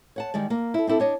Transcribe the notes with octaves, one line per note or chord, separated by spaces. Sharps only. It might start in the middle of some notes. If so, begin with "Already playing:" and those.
C#5 F#5 A5
D#3 G3 G#3 D5
A#3
E4 A4
C4 D4 E4 A4
D4 C#5 D#5